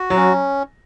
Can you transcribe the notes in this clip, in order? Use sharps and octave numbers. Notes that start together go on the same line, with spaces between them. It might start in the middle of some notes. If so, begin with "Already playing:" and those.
Already playing: F#4
F#3
C#4